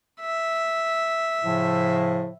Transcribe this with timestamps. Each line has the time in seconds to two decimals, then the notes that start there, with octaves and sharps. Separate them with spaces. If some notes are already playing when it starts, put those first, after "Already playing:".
0.21 E5
1.44 A2 C#3 F3